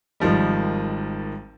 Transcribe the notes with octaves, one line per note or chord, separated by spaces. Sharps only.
G#1 D#3 F3 G3